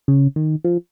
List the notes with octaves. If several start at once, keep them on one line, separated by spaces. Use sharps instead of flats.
C#3
D#3
F3